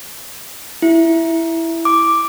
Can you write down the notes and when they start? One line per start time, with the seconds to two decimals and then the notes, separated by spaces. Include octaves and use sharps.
0.82 E4
1.85 D6